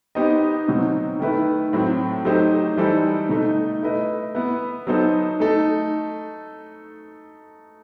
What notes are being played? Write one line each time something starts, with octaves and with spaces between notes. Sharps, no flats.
B3 D#4 G4 C5 D#5
B2 F#3 C4 D#4 F#4
D#3 A3 E4 B4 E5
A2 F#3 C4
F#3 A3 D#4 G4 C5
E3 G3 D#4 A4 C5
B2 A3 D#4
A3 E4 B4 D#5
B3 E4 B4
F#3 B3 D#4 A4 C5
A3 D#4 A4